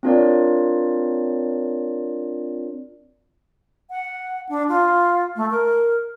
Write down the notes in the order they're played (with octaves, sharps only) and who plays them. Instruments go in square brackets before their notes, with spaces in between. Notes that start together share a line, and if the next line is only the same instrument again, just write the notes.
[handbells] C4 D4 F4 A#4 C#5 D5
[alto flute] F#5
D4
F4
A3
A#4